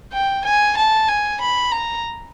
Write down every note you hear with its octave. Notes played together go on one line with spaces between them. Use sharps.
G5
G#5
A5
G#5
B5
A#5